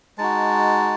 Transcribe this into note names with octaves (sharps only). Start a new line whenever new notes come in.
G#3 D#4 F#4 A5